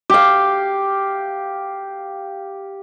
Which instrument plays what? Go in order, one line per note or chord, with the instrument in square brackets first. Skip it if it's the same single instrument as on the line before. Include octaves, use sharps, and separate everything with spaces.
[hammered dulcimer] G4 F5